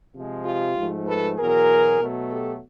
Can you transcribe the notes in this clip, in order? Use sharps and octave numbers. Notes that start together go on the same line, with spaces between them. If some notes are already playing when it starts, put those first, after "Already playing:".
C3 F3 G#3
F4 G4
G#2 F3 A3
A4 B4
E2 B2 F#3 G#4 A#4
B2 F#3 A3
G4 A4